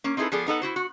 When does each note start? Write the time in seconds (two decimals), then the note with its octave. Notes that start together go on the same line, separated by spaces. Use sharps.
0.04 A#3 C#4
0.17 C4 D#4 E4 G#4 A4 B4
0.32 F3 B3 G#4 A4 D5
0.46 B3 D#4 A4 F#5
0.62 E4 F#4 C5
0.76 F#4